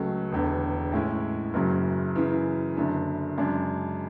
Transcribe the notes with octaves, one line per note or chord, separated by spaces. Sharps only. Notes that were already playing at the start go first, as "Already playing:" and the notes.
Already playing: C#2 C#3 F#3 A3
E1 E2 D3
A2 G#3 C#4 E4
F#1 F#2 C#3 F#3
F#2 C#3 E3
F#1 F#2 D3
F#2 C#3 G#3 D4